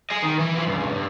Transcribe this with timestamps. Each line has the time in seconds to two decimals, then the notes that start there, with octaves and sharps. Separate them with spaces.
0.10 G#4 D#5
0.23 D#3
0.39 E3
0.55 E3 F3
0.67 C#2 G2
0.94 G2